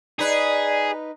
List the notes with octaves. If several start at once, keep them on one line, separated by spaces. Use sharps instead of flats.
D#4 G#4 B4 D5